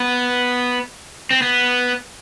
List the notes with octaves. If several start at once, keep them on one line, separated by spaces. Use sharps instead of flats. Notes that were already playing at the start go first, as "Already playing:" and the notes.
Already playing: B3
C4
B3